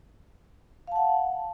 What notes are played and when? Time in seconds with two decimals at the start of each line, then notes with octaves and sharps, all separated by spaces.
0.87 F5
0.92 A5
0.96 F#5